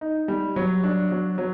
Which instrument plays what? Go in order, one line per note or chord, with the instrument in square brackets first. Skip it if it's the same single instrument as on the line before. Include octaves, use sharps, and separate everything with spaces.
[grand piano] D#4
G3
F#3
D4
F#3
F#3